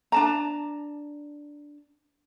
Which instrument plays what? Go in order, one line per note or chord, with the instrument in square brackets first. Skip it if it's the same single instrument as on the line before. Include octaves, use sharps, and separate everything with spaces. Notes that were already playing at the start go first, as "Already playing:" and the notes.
[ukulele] D4 A5 A#5